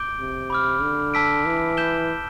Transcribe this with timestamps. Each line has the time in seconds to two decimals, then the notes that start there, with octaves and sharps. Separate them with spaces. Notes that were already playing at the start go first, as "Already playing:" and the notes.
Already playing: D6 G6 D7 G7
0.19 C3
0.50 B5 D6 F6
0.82 D3
1.14 A5 E6 B6 D7
1.46 E3
1.77 G6 B6 E7 G7